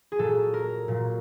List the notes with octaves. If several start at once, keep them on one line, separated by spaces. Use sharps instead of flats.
G#4
A#2 F#3 A4
A#4
A#2 F#3